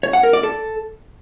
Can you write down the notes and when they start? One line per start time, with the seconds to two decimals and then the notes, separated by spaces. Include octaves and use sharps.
0.03 C#5
0.13 F#5
0.23 A#4
0.33 D5
0.43 A4